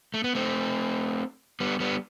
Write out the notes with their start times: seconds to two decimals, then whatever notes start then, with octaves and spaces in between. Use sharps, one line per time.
0.14 A3
0.24 B3
0.35 A3 C4
1.60 G3 B3
1.80 G3 B3